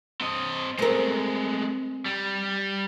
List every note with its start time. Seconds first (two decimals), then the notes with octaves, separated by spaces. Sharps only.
0.21 C4 D#5
0.79 G#3 A3 C4 A#4
2.06 G3